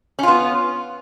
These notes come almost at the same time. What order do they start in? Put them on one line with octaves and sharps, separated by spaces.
C#4 F4 B3